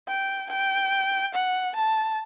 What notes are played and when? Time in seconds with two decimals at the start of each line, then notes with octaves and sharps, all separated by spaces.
0.08 G5
0.50 G5
1.34 F#5
1.76 A5